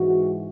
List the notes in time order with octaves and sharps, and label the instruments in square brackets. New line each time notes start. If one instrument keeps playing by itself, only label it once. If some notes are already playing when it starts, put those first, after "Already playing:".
Already playing: [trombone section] G#2 E3 G#3 F#4